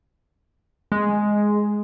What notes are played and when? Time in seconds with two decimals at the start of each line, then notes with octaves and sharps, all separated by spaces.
0.92 G#3